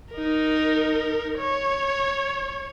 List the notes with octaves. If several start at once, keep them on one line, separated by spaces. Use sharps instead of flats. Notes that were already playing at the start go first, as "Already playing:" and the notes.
D#4 A#4
C#5